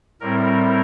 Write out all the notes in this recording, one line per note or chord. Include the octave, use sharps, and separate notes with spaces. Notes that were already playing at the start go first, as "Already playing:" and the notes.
A2 G3 C4 E4 A#4